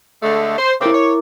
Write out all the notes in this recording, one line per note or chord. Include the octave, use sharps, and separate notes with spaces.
D3 G#3 A3
C5
C#3 A3 C4 E4 A#4 D6
C#5